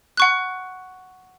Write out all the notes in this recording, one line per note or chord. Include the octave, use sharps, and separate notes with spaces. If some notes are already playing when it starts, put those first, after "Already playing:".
F#5 C#6 F#6